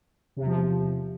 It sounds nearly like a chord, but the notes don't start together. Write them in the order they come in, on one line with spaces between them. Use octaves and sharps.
C3 E2 F3